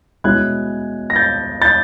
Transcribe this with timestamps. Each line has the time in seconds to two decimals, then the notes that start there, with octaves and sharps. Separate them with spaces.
0.24 B2 G#3 C#4 E4 F#6 G#6
1.10 A#6
1.16 G6 A6
1.62 G6 A6